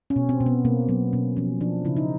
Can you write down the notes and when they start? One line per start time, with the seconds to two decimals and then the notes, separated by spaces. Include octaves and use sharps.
0.10 C#4
0.16 B2
0.29 C4
0.41 B2
0.46 B3
0.65 B2 A#3
0.89 F#3 B3
1.13 B2 C#4
1.37 F3 C#4
1.61 F3 D4
1.85 C#3 E4
1.97 D#4